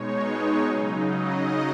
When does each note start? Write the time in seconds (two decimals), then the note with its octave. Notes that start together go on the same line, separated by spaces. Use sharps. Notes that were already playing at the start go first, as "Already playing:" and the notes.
Already playing: B2 G#3 D#4 C#5
0.22 C#5
0.64 C#3 F#3 D#4
1.05 D#5